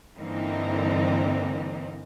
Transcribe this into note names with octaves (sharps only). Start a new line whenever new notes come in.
G2 D3 E3 A#3 C4 D#4